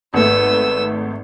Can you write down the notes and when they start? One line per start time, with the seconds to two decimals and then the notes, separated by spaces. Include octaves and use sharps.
0.14 G#1 A3 B3 E6